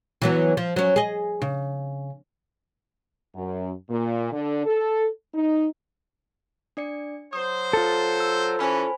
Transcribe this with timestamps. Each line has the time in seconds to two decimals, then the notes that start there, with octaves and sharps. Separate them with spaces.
0.22 E3 F#3 B3
0.57 F3
0.76 F#3 C#4
0.96 G#4 D#5
1.42 C#3
3.35 F#2
3.89 A#2
4.32 D3
4.66 A4
5.34 D#4
6.77 D4 D5 C#7
7.33 F#3 C5 D#6
7.73 F4 A4
8.20 E6
8.59 E3 C#4 C5 G#5 B5